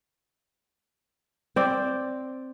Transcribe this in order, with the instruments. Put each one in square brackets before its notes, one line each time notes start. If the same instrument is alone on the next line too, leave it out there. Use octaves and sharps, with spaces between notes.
[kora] C4 D5